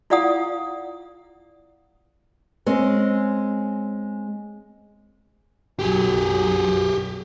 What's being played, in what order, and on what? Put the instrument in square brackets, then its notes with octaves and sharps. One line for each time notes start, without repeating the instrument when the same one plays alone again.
[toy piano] E4 F4 D5 F5 F#5 D#6
[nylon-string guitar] G#3 C4 C#4
[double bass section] B1 F#2 F#3 [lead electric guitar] G4 G#4